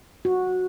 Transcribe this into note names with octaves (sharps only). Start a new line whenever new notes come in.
F#4